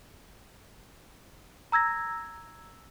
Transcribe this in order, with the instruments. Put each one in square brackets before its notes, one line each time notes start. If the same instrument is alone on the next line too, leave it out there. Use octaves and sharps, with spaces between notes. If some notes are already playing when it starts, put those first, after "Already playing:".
[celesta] A#5 E6 G#6 A#6